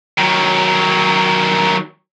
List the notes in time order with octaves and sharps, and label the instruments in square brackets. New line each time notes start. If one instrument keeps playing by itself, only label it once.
[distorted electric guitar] D#3 F#3